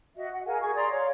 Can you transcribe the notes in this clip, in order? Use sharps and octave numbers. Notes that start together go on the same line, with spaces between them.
F#4 D#5 E5
F#5
G#4 A#4 F5 G#5
G#4 C#6
D5 A#5 C6 D#6
C#5 F5